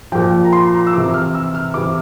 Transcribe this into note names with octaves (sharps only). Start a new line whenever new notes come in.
A#2 F3 G5
A#5
C6
A#5
E6
C3 E3 D6
F6
E6
F6
C3 E3 D6